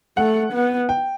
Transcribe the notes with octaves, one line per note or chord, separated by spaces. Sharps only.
A3 F#5
B3
G5